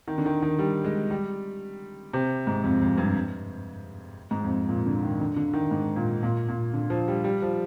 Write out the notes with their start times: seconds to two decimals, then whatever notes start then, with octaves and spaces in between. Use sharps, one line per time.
0.08 D#3
0.18 D3
0.26 D#3
0.42 D#3
0.59 G3
0.84 G#3
1.10 G3
2.13 C3
2.47 G#2
2.64 F2
2.81 F2
2.98 G2
4.31 G#2
4.44 F2
4.69 A#2
4.86 D3
5.03 D#3
5.20 D3
5.36 D3
5.54 D#3
5.71 G#2
5.96 A#2
6.23 A#2
6.49 A#2
6.73 D3
6.90 F3
7.08 G3
7.24 G3
7.42 F3